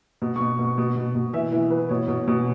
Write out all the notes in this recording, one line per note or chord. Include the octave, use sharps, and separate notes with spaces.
B2
C#6
B2
B2 C#6
B2
B2
B2
E3 E5
E3 E5
E3 B4
B2 C#5
B2
B2